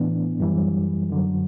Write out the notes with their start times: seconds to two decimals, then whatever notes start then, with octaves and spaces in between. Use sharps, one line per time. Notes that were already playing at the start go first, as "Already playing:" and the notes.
Already playing: A2 E3 B3 D4
0.40 F#2 E3 G3
1.09 F#2 D3 F#3